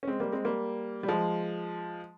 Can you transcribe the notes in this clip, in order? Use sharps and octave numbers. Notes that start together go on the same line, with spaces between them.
C#4
G#3 C4
G3 A#3
G#3 C4
G3 A#3
G3
F3 G#3